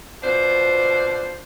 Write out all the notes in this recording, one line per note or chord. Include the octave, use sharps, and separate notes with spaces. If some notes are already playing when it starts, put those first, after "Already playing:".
B2 D4 F4 C5